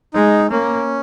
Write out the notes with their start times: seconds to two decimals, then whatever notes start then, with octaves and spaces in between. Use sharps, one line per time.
0.14 G#3 D#4
0.51 A#3 C#4